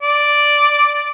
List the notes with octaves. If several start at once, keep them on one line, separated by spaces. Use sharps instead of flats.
D5